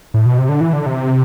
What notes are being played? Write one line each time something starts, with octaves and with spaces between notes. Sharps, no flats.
A2
B2
C3
D3
E3
D3
C3